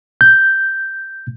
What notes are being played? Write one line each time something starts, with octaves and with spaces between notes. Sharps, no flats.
G6